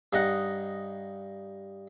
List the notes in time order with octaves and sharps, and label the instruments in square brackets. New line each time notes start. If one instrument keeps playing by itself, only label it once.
[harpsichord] G2 D#4 D#5 F#5